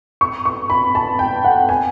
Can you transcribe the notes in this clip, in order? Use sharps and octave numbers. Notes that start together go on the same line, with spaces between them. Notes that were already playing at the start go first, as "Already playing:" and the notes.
C#6
C#6
B5
A5
G5
F#5
G#5